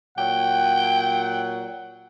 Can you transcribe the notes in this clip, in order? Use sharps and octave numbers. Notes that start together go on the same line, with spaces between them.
A#2 F#3 F#5 G5